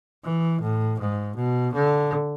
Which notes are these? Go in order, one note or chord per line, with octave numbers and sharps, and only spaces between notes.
E3
A2
G#2
B2
D3